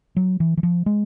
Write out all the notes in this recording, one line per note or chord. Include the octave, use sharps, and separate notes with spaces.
F#3
E3
E3
F3
G#3